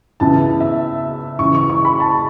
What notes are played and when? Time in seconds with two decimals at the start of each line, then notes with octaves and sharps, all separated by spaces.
0.20 C#2 C#3 E3 B3 E4 A5
0.60 E5
1.39 C#2 C#3 E3 C#6
1.55 C#6
1.70 C#6
1.85 B5
2.00 A5